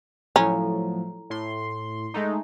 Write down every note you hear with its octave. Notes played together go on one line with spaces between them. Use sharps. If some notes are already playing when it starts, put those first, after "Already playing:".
A2 F3 F#3 C#4 E4 A4 A#5
A2 C6
G#3 A3 D#4